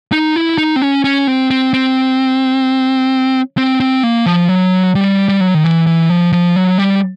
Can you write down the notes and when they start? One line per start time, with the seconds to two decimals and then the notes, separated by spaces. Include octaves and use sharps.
0.12 D#4
0.36 E4
0.58 D#4
0.76 C4
0.82 C#4
1.04 C#4
1.27 C4
1.51 C4
1.73 C4
3.57 C4
3.80 C4
4.03 A#3
4.26 F3
4.49 F#3
4.95 G3
5.29 G3
5.41 F#3
5.54 D#3
5.64 E3
5.87 E3
6.10 F3
6.32 F3
6.56 F#3
6.78 G3